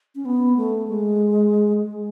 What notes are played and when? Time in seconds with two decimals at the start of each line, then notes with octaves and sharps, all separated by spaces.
0.15 C#4
0.25 B3
0.57 A3
0.88 G#3
1.83 G#3